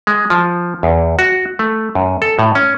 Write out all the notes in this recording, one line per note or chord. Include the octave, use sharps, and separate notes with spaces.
G#3
F3
E2
F#4
A3
F#2
A4
A2
C#4